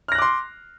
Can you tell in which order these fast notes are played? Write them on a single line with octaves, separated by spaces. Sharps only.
F6 A#6 F#6 D6 C6